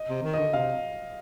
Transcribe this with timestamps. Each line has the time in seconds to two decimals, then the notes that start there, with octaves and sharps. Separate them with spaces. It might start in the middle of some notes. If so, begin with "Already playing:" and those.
Already playing: D#5
0.09 C3
0.23 D#3
0.33 D#5
0.39 D3
0.53 C3 F5